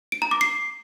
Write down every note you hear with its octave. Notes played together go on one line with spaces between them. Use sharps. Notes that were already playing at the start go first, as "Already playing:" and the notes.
D7
A#5
D6
C7